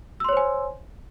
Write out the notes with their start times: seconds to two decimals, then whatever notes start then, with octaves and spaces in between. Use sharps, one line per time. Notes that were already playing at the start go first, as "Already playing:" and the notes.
0.20 E6
0.24 C6
0.29 C#5
0.33 C5
0.37 G#5